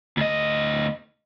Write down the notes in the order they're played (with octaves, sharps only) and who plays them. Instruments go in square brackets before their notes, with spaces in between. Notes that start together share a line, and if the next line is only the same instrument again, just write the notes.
[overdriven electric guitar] D2 D#5